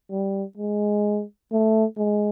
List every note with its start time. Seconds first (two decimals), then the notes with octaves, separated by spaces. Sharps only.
0.11 G3
0.58 G#3
1.52 A3
1.98 G#3